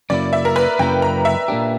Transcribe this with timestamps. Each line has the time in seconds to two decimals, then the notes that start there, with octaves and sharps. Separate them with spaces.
0.10 F#2 C#3 F#3 A#3 E4 D5
0.33 E5
0.45 A#4
0.56 B4
0.79 F#2 C#3 F#3 A#3 E4 G5
1.02 A#5
1.25 E5
1.48 A#2 A#3 D4 G4